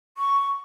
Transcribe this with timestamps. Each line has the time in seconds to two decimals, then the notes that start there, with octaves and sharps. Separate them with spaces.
0.18 C#6